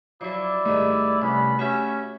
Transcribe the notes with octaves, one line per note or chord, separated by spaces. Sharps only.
F3 F#3 E4 D5
G#2 D#3 G3 A3
C2 B3 C#4 B5
C#4 F#4 G4 E5